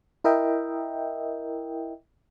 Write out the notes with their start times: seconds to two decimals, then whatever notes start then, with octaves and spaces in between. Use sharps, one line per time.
0.24 E4 A#4 D#5 E5 G5